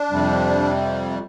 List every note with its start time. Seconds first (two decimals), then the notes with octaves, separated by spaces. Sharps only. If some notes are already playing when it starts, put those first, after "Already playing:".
Already playing: D4
0.11 F2 C3 G3